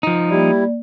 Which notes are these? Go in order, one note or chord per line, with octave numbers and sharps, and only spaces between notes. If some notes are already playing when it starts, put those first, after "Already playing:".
F3 D#4
G3 A#3 E4 D5